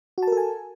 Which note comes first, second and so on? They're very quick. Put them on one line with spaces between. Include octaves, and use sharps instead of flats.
F#4 A5 A#4 A4 G#5